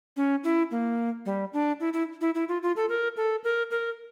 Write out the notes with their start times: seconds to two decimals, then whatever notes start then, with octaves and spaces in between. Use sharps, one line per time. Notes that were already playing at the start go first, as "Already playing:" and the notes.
0.17 C#4
0.44 E4
0.71 A#3
1.26 G3
1.53 D4
1.80 E4
1.93 E4
2.21 E4
2.35 E4
2.49 F4
2.63 F4
2.76 A4
2.89 A#4
3.17 A4
3.44 A#4
3.71 A#4